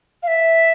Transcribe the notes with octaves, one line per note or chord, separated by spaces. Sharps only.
F5
E5